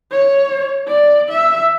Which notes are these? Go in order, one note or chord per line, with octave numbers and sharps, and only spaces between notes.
C#5
D5
E5